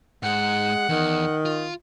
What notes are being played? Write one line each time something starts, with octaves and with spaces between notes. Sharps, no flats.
G#2 G#3 F#5
E2 D#3
F4